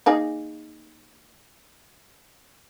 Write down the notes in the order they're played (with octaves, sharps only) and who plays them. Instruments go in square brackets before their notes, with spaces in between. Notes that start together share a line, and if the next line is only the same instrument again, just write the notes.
[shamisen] A#3 D#4 G#4